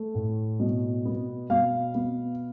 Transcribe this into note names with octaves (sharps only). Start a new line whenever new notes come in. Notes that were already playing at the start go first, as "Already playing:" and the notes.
Already playing: A3
A2
B2
B3
B2 F5
B3